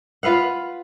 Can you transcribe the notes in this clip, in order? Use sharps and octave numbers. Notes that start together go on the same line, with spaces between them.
F4 B4 F5 F#5